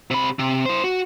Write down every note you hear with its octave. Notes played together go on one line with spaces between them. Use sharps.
C3 B5
C3
E4 C5
F#4